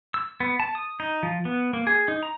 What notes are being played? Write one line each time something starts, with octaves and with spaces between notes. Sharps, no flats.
E6
B3
A5
D#6
D#4
F3
B3
A#3
G#4
D#4
A#5